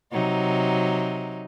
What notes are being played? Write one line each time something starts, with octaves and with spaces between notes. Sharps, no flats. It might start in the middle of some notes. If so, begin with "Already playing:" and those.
C3 F#3 D#4